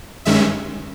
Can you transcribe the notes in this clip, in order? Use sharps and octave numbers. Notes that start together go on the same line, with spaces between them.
G2 D#3 G#3 C#4 E5